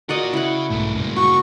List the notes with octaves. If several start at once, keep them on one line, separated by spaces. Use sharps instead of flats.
F4 F#4 A#4 D5 D#5
C#3 E4 F#5
B1 G#2 B2 A3 B3
G2 A#2 C#3 G#3 A#3
F#4 C#6